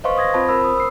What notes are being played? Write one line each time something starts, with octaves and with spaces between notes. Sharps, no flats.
B4 C5 D#5 F5 C6 C#6
D#6 G#6 A#6
C4 F4 C5 A5 B5
A#4 C5 B5 E6
D#6
D#6 E6 C7